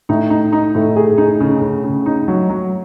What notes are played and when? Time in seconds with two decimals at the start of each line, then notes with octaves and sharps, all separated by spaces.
0.09 A2 D#4
0.30 D#4
0.53 D#4
0.75 A2 A3
0.96 G#4
1.18 D#4
1.40 C#3
1.62 C#3
1.84 C#3
2.06 D#4
2.28 F#3
2.50 F#3